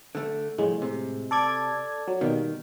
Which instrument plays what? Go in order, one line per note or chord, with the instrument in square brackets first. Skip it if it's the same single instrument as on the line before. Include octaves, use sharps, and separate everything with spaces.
[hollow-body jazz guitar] D3 A3
[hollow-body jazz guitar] C2 F2 [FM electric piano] A2 G#3
[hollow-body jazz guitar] C3
[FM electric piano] A4 D5 G#6
F#3
[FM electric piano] B2 G3 A#3 [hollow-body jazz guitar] D#3